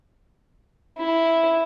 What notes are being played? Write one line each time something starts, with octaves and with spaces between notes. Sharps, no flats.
E4